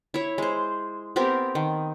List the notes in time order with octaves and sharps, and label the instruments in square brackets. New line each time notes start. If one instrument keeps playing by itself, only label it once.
[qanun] E4 C#5
G#3 C5
B3 C4 G4 A#4
D#3